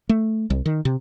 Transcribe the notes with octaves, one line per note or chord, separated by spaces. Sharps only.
A3
C2
D#3
C3